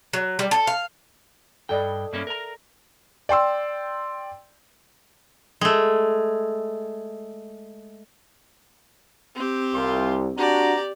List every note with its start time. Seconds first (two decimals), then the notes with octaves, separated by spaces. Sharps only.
0.13 F#3
0.39 G3
0.51 A4
0.67 F5
1.69 G2 A4 D5 D#5 G5
2.13 G2 A#3 C#4 E5
2.27 A#4 A#5
3.29 D5 G5 C6 E6
5.61 G#3 A3
9.35 C4 G4
9.74 C2 F4 C6
10.37 D4 F#4 G4 D5 A#5